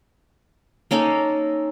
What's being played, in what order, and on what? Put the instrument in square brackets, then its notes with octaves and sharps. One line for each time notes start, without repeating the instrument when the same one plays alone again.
[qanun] A#3 C#4 D#4 A4